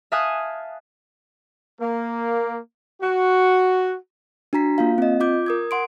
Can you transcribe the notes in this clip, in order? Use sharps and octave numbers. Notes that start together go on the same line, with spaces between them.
E5 F5 G#5 A5 D#6 F#6
A#3
F#4
D4 F#4 A#5 B6
A#3 F4 F5
C4 D#5
F4 D6 G6
A#4 D#6 G#6
F#5 C6 D7